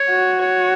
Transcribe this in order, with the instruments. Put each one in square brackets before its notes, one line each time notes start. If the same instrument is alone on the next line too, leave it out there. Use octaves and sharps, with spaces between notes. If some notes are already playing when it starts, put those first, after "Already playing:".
Already playing: [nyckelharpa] C#5
[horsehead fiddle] F#4
[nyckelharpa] C#5